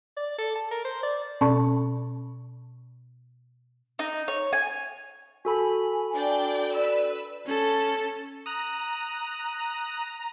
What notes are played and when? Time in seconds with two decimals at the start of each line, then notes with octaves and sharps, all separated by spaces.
0.17 D5
0.38 A4
0.56 A5
0.71 A#4
0.85 C5
1.03 D5
1.41 B2 C#4 D5 A5 C#6
3.99 D#4
4.28 C#5
4.53 G#5
5.45 F#4 A4 G#5 B5
6.13 D4 D5 G5
6.75 B4 D5 E6
7.46 C#4 A4
8.46 A#5 D#6 F#6